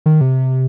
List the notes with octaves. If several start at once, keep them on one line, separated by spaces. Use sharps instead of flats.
D#3
C3